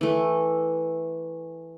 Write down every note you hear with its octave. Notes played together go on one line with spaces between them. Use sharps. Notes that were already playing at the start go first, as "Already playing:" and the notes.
E3 A3